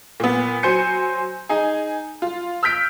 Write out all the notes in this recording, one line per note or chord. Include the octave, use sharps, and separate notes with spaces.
A#2 B3
F#3 C5 G#5 G6 C#7
D#4 G#4
F4
E6 F6 G6 B6 D7